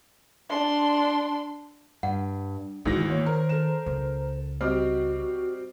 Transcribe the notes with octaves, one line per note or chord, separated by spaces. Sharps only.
D4 C6
G2 F#5
D2 G#2 D#3 E3 F#4 A#6
A#3 C#5
A#4 C5
A4 E7
C#2
G3 C4 F#4 D#5 D6 F6